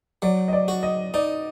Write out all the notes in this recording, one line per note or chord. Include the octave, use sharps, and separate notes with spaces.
F#3 D5
D#5
D5
F#4
D#5
D#4 D5